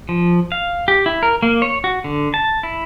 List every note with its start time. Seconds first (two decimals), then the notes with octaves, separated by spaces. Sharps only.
0.09 F3
0.52 F5
0.88 G4
1.06 E4
1.23 A#4
1.43 A#3
1.62 C#5
1.84 F#4
2.04 D3
2.34 A5
2.63 E4